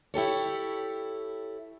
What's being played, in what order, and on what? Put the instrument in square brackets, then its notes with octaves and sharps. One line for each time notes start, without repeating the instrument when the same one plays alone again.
[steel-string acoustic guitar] E4 G4 A4 C#5